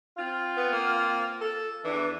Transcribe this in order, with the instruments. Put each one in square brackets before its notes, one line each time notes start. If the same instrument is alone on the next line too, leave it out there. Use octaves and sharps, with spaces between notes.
[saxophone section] C4 F4
[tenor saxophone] B3
A#3
A4
[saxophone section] E2 D4 [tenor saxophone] E3